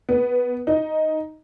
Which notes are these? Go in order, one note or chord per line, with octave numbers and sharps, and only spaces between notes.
B3
D#4